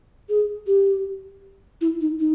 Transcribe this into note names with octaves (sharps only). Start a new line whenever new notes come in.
G#4
G4
E4
D#4
D#4